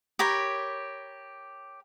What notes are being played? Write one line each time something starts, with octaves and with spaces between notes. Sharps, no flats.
G4 A#4 C#5 B5